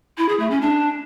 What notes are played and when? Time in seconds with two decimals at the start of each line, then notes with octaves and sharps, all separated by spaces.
0.18 E4
0.29 G#4
0.40 A3
0.51 C#4
0.61 D4